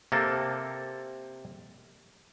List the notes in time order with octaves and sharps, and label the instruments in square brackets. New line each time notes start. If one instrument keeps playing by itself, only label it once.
[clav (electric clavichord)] C3 A#3 C4 A4